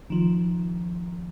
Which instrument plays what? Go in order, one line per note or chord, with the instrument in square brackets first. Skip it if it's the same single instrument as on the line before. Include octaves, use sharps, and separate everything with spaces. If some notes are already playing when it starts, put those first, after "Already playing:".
[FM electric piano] D#3 F3